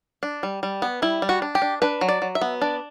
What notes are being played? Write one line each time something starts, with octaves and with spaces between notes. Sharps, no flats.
D4
G3
G3
B3
G3 E4
G3
F#4
D4
G4
D4
D4 B4
F#3
D5
F#3
E5
B3
D4 D5